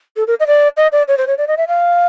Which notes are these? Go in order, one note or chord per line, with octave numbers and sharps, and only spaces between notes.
A4
A#4
D#5
D5
D#5
D5
C#5
C5
C#5
D5
D#5
E5
F5